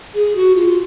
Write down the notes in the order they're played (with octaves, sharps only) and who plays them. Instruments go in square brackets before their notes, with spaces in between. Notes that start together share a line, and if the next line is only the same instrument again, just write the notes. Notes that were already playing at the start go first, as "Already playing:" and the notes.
[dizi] G#4
F#4
F4